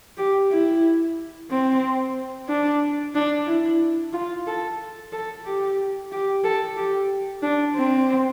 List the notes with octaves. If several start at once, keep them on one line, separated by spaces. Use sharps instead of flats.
G4
E4
C4
D4
D4
E4
F4
A4
A4
G4
G4
A4
G4
D4
C4